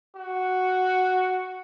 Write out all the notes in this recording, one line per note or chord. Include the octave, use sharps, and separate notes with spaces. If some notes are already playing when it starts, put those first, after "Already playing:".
F#4